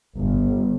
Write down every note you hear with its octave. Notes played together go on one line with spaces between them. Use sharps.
G1